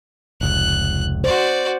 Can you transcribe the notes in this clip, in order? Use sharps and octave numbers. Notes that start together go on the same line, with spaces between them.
F1 C#2 F#6
F#4 C5 D5